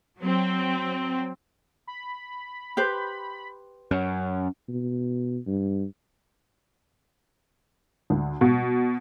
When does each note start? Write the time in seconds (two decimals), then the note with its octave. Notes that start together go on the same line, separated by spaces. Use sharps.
0.19 F#3 C4
1.87 B5
2.77 G4 B4 C5
3.91 F#2 C#4
4.69 B2
5.47 G2
8.10 D2
8.41 B2